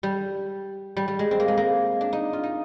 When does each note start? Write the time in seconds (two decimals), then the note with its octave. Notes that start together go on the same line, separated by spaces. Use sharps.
0.03 G3
0.97 G3
1.08 G3
1.19 G#3
1.31 C4
1.40 A#3
1.48 G#3
1.57 A#3
2.01 D4
2.13 D#4
2.33 F4
2.43 D#4